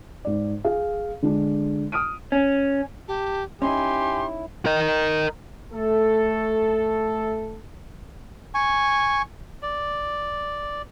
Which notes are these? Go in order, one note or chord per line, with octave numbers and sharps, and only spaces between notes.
G#2 D5
G#4 F5
D3 G#3 D4
D#6 F6 D7 D#7
C#4
G4 A5
C#4 D#4 E4 G4 G#5 C6
A#4 D#5
A3 A4
G#5 C#6
D5